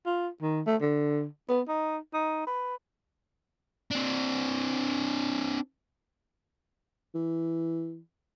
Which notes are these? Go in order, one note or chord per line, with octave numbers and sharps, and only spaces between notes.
F4
D#3
A3
D3
B3
D#4
D#4
B4
C4 D4
E3